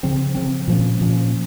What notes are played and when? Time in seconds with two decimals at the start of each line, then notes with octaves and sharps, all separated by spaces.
0.03 C#3 F3 C4
0.35 C#3 F3 C4
0.68 A#2 F3 A#3 C#4
1.01 A#2 F3 A#3 C#4